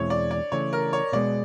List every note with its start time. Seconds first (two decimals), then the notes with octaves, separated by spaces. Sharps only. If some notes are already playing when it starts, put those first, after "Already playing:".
Already playing: E2 B2 G#3 C4 E4 C#5
0.10 D5
0.31 D5
0.52 C#3 E3 A3 C#5
0.73 A#4
0.93 C#5
1.13 B2 G#3 B3 D5